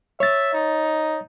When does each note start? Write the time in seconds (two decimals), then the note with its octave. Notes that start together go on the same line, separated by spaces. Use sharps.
0.20 C#5 E5 A6
0.54 D#4